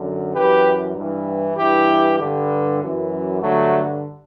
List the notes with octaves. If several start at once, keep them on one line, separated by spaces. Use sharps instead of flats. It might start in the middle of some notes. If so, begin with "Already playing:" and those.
Already playing: F#2 D3
F#2 E3 G4 B4
G2 E3
G2 E3 E4 G4
G2 D3
F#2 E3
G2 D3 F#3 A3